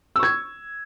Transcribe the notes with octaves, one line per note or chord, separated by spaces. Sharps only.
C#6 E6 G#6